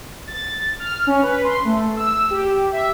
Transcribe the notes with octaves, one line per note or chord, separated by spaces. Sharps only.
A6
F6
C#4
B4
C6
A3
E6
G4
E5